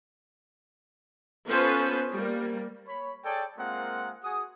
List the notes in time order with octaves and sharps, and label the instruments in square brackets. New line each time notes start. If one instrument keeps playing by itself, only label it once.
[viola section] B3 C#4 F4 A4 B4 C5
G3 A#3
[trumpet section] C#5 B5
G#4 A4 C#5 D5 G5 G#5
G#3 A#3 C4 F4 A#4 F#5
F#4 G#4 F#5 G#5 D#6